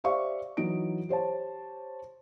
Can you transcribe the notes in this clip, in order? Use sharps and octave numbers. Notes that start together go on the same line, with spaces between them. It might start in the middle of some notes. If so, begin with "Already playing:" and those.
G4 C5 D5 E5 F5 C#6
E3 F#3 D#4 D7
G4 C5 C#5 A5